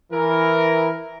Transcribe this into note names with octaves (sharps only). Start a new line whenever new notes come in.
E3 A#4